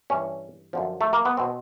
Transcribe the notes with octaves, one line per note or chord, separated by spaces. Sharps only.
G2 E3 C#4
F#2 D3 F3
A3
A#3
B3
B2 C4